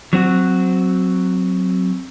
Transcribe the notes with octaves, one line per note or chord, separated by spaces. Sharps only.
F#3 C4 F#4